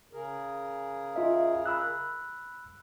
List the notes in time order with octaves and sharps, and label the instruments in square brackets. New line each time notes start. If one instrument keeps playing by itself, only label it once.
[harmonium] C#3 G#4 A#4
[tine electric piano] F4 D#5 E5
B5 E6 F#6